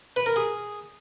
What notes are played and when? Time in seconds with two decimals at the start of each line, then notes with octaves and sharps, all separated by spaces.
0.16 B4
0.26 A#4
0.36 G#4